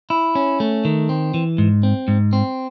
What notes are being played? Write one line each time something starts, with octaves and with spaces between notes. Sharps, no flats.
E4
C#4
A3
D#3
C4
E3
G#2
C4
G#2
C4